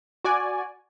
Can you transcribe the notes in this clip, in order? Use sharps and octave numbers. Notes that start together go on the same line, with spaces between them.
F#4 D5 G#5